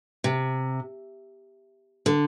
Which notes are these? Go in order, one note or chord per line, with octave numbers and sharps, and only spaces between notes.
C3
D3